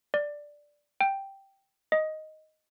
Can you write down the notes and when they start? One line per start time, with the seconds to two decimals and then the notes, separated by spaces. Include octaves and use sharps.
0.14 D5
1.01 G5
1.92 D#5